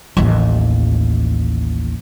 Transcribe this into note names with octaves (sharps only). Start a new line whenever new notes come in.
A1 D#2